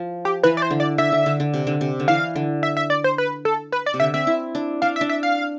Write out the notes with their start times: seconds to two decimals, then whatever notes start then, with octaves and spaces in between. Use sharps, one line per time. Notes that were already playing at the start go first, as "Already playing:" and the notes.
Already playing: F3
0.25 G4
0.43 E3 B4
0.57 D5
0.62 C5
0.71 D3
0.80 D5
0.98 D3 E5
1.12 D3
1.26 D3
1.40 D3
1.54 C3
1.67 D3
1.81 C3
2.00 D3
2.08 E3 F5
2.35 D3
2.63 E5
2.77 E5
2.90 D5
3.04 C5
3.18 B4
3.45 A4
3.72 B4
3.86 D5
3.94 C3
4.00 D3 E5
4.14 C4 E5
4.27 E4
4.55 D4
4.82 D4 F5
4.96 E5
5.01 D4
5.09 E5
5.23 F5